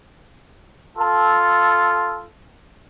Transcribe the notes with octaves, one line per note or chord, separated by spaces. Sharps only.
F4 A4